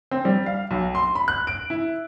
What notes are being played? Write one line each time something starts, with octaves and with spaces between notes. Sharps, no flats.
C4
G3
F5
B1
C6
B5
F#6
D7
E4